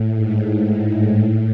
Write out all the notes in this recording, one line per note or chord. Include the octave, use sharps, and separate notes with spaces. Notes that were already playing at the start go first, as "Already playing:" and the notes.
Already playing: A2
G#2
G#2
A2